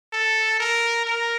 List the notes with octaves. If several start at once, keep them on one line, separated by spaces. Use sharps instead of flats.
A4
A#4
A#4